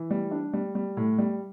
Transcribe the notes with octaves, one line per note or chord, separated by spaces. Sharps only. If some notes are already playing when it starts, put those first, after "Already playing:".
Already playing: E3
G3
D4
G3
G3
A2
G3